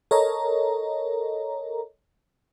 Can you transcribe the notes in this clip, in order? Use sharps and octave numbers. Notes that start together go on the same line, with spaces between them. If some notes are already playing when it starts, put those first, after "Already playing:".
A4 A#4 C#5 D#5 A#5